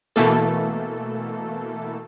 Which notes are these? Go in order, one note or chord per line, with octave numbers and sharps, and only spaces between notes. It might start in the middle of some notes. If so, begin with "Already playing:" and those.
B2 E3 A3 A#3 A4